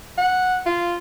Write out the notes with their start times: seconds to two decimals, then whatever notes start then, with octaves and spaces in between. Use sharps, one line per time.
0.18 F#5
0.66 F4